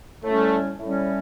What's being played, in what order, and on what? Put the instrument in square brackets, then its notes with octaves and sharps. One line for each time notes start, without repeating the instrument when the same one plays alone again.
[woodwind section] A2 G3 C#4 [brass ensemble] A3
[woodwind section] A2 G3 C#4